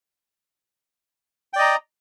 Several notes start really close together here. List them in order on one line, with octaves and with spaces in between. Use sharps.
G5 D5 D#5 A#5